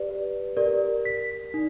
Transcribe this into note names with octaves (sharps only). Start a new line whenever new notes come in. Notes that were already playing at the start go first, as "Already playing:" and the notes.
Already playing: G4 B4 D5
G4 A#4 D5
B6
D#4